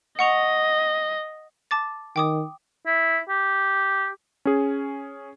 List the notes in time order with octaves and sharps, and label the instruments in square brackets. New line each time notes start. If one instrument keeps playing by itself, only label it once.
[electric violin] D#5 [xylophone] F#5 C#6 F7
[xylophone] A5 D6 A6
[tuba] D#3 [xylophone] G5 D6 D#6
[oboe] E4
G4
[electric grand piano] C#4 G#4